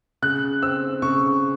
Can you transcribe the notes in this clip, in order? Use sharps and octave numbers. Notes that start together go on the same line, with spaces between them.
C#3 F#6
C4 E6
C#3 C#6